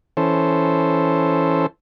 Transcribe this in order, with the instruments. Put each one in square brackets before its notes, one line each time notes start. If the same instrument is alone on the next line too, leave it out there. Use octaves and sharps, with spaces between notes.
[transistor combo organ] E3 C#4 A4 C5